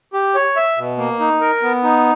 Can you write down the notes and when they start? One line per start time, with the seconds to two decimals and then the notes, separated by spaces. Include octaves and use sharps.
0.13 G4
0.35 C#5
0.56 E5
0.78 B2
0.98 A#3
1.20 D#4
1.41 A#4
1.63 B3
1.83 D#4